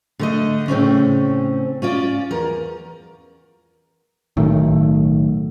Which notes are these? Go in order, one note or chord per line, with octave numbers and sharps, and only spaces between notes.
D3 A3 D#5
A2 C#3 C4 C#4
C#4 F4 D5
E2 A#4
B1 A2 D#3 A3